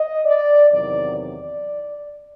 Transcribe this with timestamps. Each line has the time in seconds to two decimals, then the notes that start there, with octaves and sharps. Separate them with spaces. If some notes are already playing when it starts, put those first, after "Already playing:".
Already playing: D#5
0.25 D5
0.71 E2 C3 D#3 F#3 D5
1.17 D5